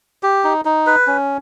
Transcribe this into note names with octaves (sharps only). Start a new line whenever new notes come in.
G4
D#4
D#4
B4
C#4